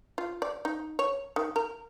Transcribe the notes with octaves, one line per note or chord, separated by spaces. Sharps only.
F4
D5
D#4
C#5
D#3
A#4